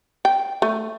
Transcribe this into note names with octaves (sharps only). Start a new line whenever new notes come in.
G5
A3